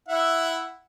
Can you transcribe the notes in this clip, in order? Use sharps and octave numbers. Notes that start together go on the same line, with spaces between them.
E4 E5 F#5